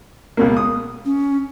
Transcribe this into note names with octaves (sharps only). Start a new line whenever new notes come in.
C#2 B2 A#3
D#6
C#4